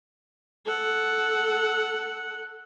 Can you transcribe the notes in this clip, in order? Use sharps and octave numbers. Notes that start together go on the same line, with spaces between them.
A4 F#5